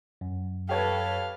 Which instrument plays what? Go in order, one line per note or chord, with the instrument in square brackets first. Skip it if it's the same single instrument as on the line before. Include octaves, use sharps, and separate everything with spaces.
[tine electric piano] F#2
[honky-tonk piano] G4 C#5 G#6 [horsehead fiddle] A4 B4 [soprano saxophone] F5